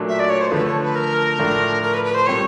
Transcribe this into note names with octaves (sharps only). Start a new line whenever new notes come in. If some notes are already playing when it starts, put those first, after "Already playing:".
Already playing: A#2 F#3 A3 D4
E5
D5
C#5
C5
D3 F3 A3 B4
C#5
B4
A#4
A2 F3 A3 D4 F4
A#4
B4
B4
C5
A#2 G3 C4 C#5